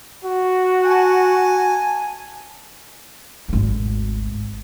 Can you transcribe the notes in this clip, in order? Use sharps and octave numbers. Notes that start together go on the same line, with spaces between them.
F#4
G#5 A5
G#1 D2